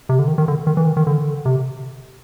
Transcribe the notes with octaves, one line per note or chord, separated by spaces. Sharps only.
C3
D3
D#3
D#3
D3
D#3
E3
D#3
D#3
D3
C3